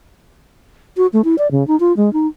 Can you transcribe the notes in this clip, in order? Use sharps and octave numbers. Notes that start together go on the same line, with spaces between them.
F#4
A3
E4
D5
C#3
D#4
F4
G#3
D#4